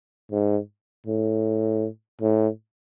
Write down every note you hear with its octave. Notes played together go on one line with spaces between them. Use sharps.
G#2
A2
A2